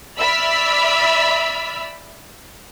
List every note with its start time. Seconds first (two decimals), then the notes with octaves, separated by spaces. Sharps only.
0.18 D5 E5 B5 E6 F6